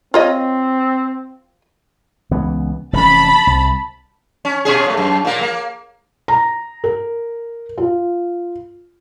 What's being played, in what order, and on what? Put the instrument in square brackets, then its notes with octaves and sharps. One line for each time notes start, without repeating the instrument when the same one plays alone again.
[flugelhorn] C4 [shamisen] F4 C#5 D#5
[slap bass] C#2 E3 B3
[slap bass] F1 E3 C#4 [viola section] A5 B5
[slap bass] C2
[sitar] C#4
B2 C#4 G#4
A#2 A3
F#2
A#2 A#3
A#3
[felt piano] A#5
A#4
F4